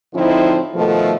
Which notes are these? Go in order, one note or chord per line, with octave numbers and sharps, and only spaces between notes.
A2 D3 F3 C4 D#4 E4
B2 D#3 F3 A3